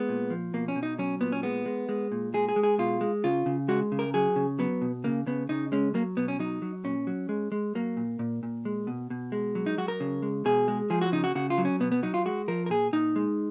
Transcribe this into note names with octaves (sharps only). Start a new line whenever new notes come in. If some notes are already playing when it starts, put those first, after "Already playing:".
Already playing: G#3 B3
A#2
F3
B2 A#3
C#4
B2
D#4
F#3 C#4
A#2 B3
C#4
G#3 B3
G#3
G#3
A#2
G#3 G#4
G#4
G#3
G#4
B2 F4
G#3
C#3 F4
C#3
G#3 F#4
C#3
A#4
F#3 G#4
C#3
F#3 B3
B2
C#3 A#3
C#3 B3
C#3 D#4
G#3 C#4
F#3 A#3
B2 B3
C#4
F#3 D#4
F#3
A#2 C#4
F#3
G#3
G#3
F#3 A#3
A#2
A#2
A#2
G#3
B2
B2
G#3
F#3
D#4
F#3 F#4
A#4
C#3
G#3
B2 G#4
G#3
F3 G#4
F#4
C#3 D#4
F#4
C#3 F#4
F4
F#3
C#4
B2 B3
B3
F#3 D#4
F4
G#3 F#4
F3 A#4
A#4
A#2 G#4
A#2 D#4
G#3